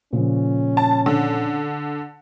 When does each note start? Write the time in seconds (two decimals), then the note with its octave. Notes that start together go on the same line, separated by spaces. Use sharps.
0.13 A#2 C#3 F3 C#4
0.77 A5
1.06 D3